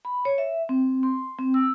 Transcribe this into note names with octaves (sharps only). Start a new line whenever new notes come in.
B5
C#5
E5
C4
C6
C4
E6